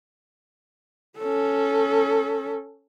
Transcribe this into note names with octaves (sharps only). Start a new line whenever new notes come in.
C#4 A4